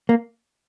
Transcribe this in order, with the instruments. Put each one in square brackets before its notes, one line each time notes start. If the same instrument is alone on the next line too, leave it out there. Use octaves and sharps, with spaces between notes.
[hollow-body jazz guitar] A#3